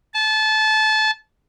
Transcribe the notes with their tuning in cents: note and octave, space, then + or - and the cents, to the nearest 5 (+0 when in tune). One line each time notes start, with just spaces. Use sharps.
A5 -25